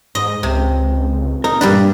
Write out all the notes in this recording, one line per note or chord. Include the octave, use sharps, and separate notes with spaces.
G#2 D#5
C#2 C3
A#2 D#4 A#4
G2 G3 D4 G4 B4